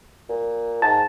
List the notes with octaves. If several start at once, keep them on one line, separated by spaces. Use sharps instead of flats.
A#2
G#2 A5